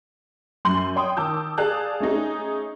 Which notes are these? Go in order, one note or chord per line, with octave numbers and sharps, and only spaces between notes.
F#2 C6 G6 F#7
C#5 G5 C6 D#6
D#3 A5 D6 E6 G6
G#4 D5 F5 A5 F#6 G6
A3 C#4 D#4 G#4